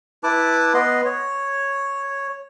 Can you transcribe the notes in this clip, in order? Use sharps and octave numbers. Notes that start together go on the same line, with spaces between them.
E4 B4 A5 D6
B3 B4 D#5 C6
C#5